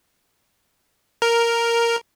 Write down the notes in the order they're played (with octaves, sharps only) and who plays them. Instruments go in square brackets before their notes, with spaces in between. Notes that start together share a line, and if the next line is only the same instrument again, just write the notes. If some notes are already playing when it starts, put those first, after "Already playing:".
[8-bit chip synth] A#4